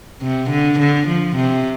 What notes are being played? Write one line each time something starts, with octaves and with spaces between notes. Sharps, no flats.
C3
D3
D3
F3
C3